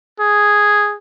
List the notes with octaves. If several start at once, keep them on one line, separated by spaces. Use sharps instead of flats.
G#4